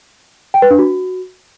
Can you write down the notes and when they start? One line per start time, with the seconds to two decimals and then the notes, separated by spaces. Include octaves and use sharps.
0.54 G5
0.62 B4
0.70 D4
0.79 F#4